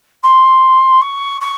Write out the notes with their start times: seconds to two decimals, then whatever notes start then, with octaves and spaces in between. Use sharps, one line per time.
0.23 C6
1.01 C#6
1.40 C#6